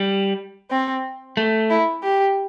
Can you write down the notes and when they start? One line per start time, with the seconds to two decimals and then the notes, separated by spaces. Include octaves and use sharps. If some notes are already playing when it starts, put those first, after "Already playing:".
Already playing: G3
0.71 C4
1.37 A3
1.70 E4
2.03 G4